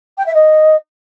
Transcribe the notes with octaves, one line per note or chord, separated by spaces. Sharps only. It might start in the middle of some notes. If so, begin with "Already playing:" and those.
G5
E5
D#5